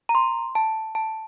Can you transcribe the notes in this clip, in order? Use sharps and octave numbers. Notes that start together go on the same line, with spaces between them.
A#5
C6
A5
A5